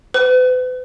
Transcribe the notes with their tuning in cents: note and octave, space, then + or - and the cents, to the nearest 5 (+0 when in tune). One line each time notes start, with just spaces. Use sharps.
B4 +40